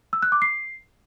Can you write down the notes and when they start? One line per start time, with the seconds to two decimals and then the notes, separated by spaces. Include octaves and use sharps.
0.13 E6
0.22 F#6
0.32 D6
0.42 C7